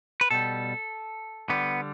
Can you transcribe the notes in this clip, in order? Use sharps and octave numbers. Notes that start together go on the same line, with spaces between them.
B4
B2 G3 A4
D3 G3 B3